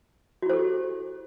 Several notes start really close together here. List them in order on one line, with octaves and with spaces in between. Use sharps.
F#4 E4 C5 A4 G4